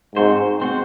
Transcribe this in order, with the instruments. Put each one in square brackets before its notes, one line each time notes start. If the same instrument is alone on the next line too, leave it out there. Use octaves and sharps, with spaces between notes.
[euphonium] G#2 [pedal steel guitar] C4 F#4 C5
[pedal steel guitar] C4 F#4 C5